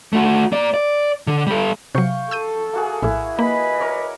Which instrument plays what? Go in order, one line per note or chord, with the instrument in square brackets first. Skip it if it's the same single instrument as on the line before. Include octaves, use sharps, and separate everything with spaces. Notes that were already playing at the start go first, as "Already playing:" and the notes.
[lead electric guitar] A3 F#4
A#3 D5
D5
D3
G3 A4
[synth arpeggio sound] C3 F#3 [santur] F5 G5 C#6
[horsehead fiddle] A4 [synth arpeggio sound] E6 G6 D#7
[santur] A#3 F#4 G#4
[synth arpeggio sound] A#1 A2 [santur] E4
[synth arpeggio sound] A#3 [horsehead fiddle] B4 D#5 [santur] B5
[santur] A#4 C#5 D5